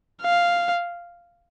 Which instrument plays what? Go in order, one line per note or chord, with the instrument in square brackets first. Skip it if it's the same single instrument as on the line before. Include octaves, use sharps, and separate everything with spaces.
[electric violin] F5